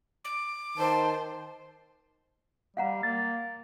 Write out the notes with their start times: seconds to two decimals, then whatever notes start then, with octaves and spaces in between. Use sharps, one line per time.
0.25 D6
0.78 D#3 C5 A5
2.77 G3 F5 F#5 A#5
3.03 A#3 A6